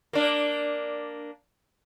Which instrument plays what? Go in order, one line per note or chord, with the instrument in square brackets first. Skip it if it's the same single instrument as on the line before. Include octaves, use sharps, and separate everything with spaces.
[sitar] A#3 D4